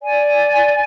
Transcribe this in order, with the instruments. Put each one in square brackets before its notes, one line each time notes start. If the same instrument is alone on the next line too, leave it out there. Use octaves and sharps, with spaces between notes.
[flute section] D5 G#5